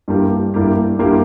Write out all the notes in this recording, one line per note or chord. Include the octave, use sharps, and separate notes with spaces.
G2 G3 A#3 E4 G4
G2 G3 A#3 E4 G4
G2 G3 A#3 E4 G4